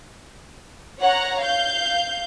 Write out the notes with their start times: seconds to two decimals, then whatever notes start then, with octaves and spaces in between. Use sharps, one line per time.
1.00 C#5 F#5 A#5
1.41 F5 G6